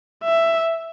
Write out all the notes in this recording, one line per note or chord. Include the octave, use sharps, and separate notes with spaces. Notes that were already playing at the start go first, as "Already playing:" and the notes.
E5